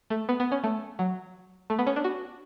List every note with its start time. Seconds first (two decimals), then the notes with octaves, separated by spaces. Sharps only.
0.10 A3
0.29 B3
0.40 B3
0.52 C#4
0.64 A3
0.99 F#3
1.70 A3
1.79 B3
1.87 C#4
1.96 D4
2.04 F#4